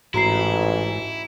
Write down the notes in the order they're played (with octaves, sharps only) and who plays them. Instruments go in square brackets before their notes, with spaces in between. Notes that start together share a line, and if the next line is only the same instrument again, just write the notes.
[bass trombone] A1 [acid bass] G#2 [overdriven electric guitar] E4 [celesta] F#4 A#5 C7